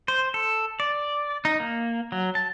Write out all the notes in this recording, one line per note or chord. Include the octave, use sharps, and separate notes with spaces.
C5
A4
D5
D#4
A#3
F#3
A5